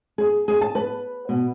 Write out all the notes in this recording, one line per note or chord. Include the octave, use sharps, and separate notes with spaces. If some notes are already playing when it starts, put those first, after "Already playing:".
G#4
G#4
A5
B4
B2